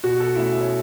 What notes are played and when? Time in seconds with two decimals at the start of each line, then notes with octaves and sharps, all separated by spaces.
0.04 B2 F#4
0.20 A4
0.35 A3 C#4 E4 E5
0.52 E5
0.61 C#5